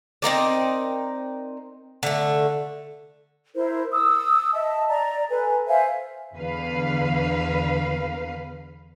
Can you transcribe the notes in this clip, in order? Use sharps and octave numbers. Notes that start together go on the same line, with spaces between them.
C4 D#4 A#4 D5
D3 A3
E4 A#4 C5
D#6 E6
D#5 E5 A5
D5 A#5
A4 B4 G#5
C5 E5 F5 G#5
E2 D3 B4 F5